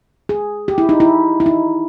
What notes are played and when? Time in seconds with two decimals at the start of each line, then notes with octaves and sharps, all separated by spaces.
0.29 G#4
0.68 G4
0.78 E4
0.89 D#4
1.00 E4
1.40 E4
1.46 D#4